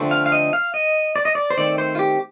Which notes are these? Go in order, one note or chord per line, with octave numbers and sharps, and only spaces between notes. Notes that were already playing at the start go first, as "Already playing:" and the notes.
Already playing: D3 F3 A3 C4
F5
F5
D#5
F5
D#5
D5
D#5
D5
C5
D#3 A3 C4 D5
C5
F4
G4